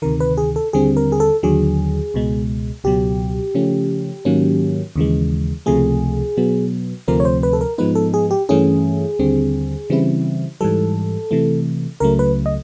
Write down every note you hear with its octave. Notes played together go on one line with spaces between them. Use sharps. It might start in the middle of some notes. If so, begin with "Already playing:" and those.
D2 C3 D#3 A#4
B4
G#4
A4
D#2 D3 G3 C4 G#4
A#4
G#4
A4
D#2 D3 F#3 G#4
C#2 B2 G#3
C#2 B2 F#3 G4
C#3 F3 A3 C#4
G#2 D#3 F#3 A#3 C#4
D#2 C#3 E3 G#3
C#2 C3 F3 A3 G#4
B2 F#3 B3
D2 C3 F3 A3 C4 A#4
C#5
C5
B4
A4
A#4
G#2 F3 G#3 B3 D#4 B4
A4
G#4
G4
G2 E3 A3 C#4 E4 G#4
D#2 D3 G3 C4
C#3 E3 G3 C4 E4
G#2 E3 G3 A4
C3 E3 A3
C#2 C#3 F#3 A3 A#4
B4
D#5